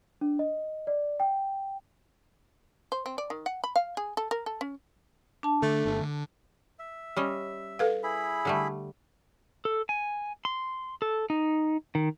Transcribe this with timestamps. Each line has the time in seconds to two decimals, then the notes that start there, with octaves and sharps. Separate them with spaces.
0.21 D4
0.39 D#5
0.87 D5
1.20 G5
2.92 C5
3.06 C4
3.18 D5
3.30 D#3
3.46 F#5
3.64 B5
3.76 F5
3.97 G#4
4.17 A4
4.31 A#4
4.46 A4
4.61 C#4
5.43 D4 A5
5.62 D3 A3
5.85 G1
6.01 D3
6.79 E5
7.16 G3 C#4 D#5
7.79 A4 B4 F5
8.03 E4 G#4 B5
8.45 D3 G3 A3
9.65 A4
9.89 G#5
10.45 C6
11.02 A4
11.30 D#4
11.95 D#3